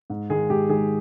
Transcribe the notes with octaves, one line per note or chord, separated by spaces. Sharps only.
G#2
D#3 G#3 G#4
G#2 G4
D#3 G#3 G#4